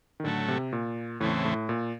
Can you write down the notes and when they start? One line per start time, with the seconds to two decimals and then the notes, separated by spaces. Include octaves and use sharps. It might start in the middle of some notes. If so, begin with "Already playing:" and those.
0.20 D#3
0.24 A2 D3 F#3 A3
0.48 C3
0.73 A#2
1.20 E2 A2 C#3 E3 A3 C4
1.45 A2
1.69 A#2